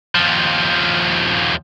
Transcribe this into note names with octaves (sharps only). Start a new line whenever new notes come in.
D#2 F3